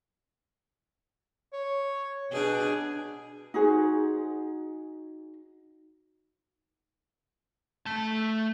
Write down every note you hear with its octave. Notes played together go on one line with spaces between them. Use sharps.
C#5
B2 D4 G#4
D#4 F#4 G#4 C5
A3 A5